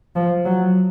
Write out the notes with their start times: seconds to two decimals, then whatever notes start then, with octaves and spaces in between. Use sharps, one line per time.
0.16 F3
0.45 F#3